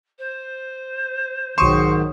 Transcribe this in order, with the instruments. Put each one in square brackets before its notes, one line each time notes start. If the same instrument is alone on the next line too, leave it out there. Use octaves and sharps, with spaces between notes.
[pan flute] C5
[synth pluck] B1 D#6 E7 [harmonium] G#2 D#3 F#3 [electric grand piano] C6 C#6